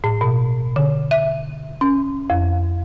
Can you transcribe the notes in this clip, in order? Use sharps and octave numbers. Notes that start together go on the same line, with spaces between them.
A2
B2
D3
E5
C#4
F2